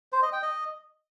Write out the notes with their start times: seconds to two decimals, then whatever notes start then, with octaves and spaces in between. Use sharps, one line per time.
0.12 C5
0.22 D#5
0.33 G5
0.43 D#5